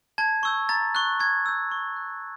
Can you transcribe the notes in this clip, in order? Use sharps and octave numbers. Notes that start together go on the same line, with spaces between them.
A5 G#6
C#6 E6 G6
A#5 A6
C#6 F#6
C#6 G#6
E6 G6
C#6
F#6